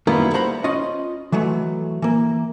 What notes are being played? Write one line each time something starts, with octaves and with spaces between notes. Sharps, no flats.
F#2 D#3 G3 A#3 B3 E4
C5 F#5 A#5 B5
C#4 F4 D#5
E3 F#3 G#3 A3
E3 A#3